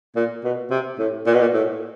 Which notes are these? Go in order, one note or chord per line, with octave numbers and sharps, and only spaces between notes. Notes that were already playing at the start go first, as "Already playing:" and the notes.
A#2
B2
C3
A2
A#2
B2
A#2
A2